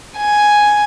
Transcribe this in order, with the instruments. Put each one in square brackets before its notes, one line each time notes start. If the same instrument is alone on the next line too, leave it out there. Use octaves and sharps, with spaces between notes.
[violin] G#5